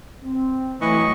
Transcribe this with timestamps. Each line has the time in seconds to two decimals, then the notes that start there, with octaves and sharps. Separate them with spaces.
0.22 C4
0.81 A2 E3 F#3 D#5 C#6